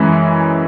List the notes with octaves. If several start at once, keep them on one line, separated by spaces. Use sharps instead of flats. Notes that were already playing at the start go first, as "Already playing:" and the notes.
Already playing: F#2 E3 G#3 C#4 E4